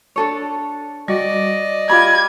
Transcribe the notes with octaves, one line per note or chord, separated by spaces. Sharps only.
D4 A4 C#5
G3 F#4 D5 D#5
F4 G4 B5 G#6